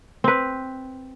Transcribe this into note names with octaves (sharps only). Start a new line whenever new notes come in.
C4 B4